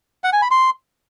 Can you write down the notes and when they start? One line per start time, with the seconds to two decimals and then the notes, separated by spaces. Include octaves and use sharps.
0.24 F#5
0.33 G#5
0.42 B5
0.51 C6